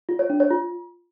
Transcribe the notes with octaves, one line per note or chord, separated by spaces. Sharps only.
F4
C#5
D4
C#5
F4